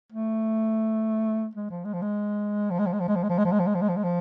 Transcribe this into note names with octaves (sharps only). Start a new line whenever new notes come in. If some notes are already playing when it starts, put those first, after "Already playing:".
A3
G#3
F3
G#3
F3
G#3
F3
G#3
F3
G#3
F3
G#3
F3
G#3
F3
G#3
F3
G#3
F3
G#3
F3
G#3
F3
G#3
F3